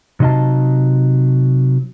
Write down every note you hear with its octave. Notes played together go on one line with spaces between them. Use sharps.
C3 F#3 D#4 D#5 F5 A5